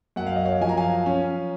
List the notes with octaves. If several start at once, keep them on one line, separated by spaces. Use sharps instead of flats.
F#2 F#5
F5
D#5
C#5 F5
F3 G#5
A#5
F5 G#5
C#4